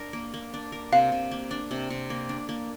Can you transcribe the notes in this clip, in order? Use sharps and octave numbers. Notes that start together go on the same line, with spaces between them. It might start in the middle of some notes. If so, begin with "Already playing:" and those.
Already playing: D4 A#4
A#3
A#3
D4
A#4
C3 F5
C3
A#3
D4
C3
C3
A#3
D4
A#3